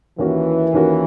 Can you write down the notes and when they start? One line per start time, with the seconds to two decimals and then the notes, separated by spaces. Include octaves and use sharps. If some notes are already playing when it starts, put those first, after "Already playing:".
0.19 D#2 D#3 E3 A#3 C#4 F#4
0.73 D#2 D#3 A#3 C#4 F#4